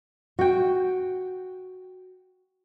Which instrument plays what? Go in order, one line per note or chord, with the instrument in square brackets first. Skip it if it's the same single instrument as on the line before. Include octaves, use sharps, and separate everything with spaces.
[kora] F#4 G5